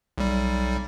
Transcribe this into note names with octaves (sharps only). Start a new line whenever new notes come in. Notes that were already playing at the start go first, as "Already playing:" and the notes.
B1 G3